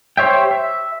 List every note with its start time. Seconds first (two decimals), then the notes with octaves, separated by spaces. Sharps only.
0.17 G4 C5 C#5 E5 G5
0.51 E5